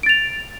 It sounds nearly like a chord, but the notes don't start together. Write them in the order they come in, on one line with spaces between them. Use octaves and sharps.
D7 A6 F7